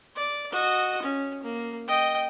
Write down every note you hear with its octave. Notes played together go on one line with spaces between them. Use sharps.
D5
F#4 D#5
C#4
A#3
D#5 G5